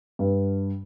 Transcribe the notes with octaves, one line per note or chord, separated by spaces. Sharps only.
G2